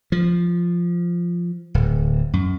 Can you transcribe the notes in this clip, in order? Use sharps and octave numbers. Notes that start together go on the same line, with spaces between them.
F3
D1
F#2